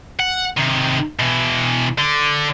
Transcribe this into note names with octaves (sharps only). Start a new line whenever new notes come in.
F#5
C3 D#3
B2 E3
D3